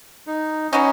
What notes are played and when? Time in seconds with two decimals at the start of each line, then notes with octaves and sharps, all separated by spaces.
0.27 D#4
0.72 F#3 B3 C#4 D#4 F#4